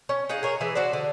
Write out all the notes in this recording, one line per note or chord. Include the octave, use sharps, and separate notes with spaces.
C#4
D#4 G#4 F5 F#5
G#4 A#4 C#5
E3 E4 G#4
F#4 C5 D5
D3